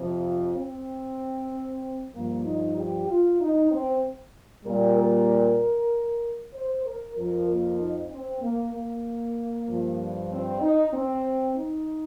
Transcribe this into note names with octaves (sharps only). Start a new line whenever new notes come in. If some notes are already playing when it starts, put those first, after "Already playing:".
Already playing: F2 C3 F3
F4
C4
G2 F3 A#3
D#4
G4
F4
D#4
C4
A#2 G3 A#4
A#4
C5
A#4
F2 F3 A#4
A#3
D#4
C4
A#3
A#3
G2 F3
C4
D#4
C4
D#4